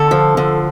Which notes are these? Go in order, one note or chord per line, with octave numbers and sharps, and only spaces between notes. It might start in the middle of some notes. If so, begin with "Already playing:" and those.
Already playing: D3 A4
F3
D3